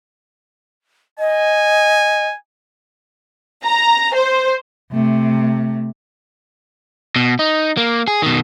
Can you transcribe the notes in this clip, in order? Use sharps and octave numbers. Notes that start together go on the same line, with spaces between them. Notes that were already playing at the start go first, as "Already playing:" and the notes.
D#5 G#5
A#5
C5
C3 A3
B2
D#4
A#3
G#4
B2 D#3